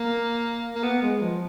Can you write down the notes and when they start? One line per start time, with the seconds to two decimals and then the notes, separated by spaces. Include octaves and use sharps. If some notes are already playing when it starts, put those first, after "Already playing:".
Already playing: A#3
0.75 A#3
0.83 B3
1.02 G#3
1.22 F3